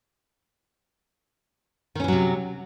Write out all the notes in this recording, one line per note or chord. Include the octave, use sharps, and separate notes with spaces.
C3 D#3 E3 F#3 C#4